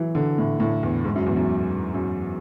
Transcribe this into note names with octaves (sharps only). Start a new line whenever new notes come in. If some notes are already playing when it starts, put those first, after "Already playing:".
Already playing: E3 F#3
D3
A2
A2
E2
G#2
F#2
E2
F#2
F#2